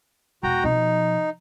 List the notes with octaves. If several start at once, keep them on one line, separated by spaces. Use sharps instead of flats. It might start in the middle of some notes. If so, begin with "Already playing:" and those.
E1 F#4 G5 A#5
B2 F3 D#4